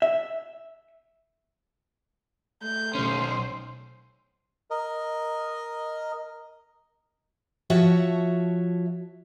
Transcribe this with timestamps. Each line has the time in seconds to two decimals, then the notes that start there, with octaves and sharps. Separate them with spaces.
0.02 E5
2.63 A3 G6
2.95 B1 C#4 C5
4.71 A#4 D#5
7.70 F3 F#4 C#5 E5 A5